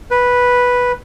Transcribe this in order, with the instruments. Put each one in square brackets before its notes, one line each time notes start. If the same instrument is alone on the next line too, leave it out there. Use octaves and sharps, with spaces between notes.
[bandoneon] B4